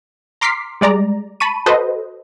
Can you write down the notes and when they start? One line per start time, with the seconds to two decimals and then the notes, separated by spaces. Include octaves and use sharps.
0.41 A#5 C6 D6 F6 B6 C7
0.81 G3 G#3 D5 A#5
1.40 A5 B5 C#6 D#7
1.66 F#4 A4 B4 C5 D#5